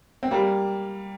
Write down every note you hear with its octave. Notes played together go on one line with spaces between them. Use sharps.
C4
G3 A#3